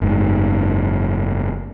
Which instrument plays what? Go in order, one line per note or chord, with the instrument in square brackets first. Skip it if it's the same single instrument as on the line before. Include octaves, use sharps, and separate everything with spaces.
[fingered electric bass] F#1 G#2